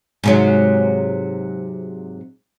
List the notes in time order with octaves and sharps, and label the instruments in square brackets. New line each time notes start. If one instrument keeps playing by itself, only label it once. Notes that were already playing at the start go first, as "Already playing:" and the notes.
[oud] G#2 C3 F#3